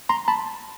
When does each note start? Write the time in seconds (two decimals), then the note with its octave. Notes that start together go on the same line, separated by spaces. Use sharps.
0.09 A#5 C6
0.28 A5 B5